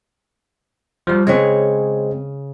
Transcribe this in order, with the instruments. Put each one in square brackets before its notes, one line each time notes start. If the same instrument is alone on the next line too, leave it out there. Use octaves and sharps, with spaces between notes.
[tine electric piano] F3 G3
[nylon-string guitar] C#3 G#4 C#5 [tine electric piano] G#3 C4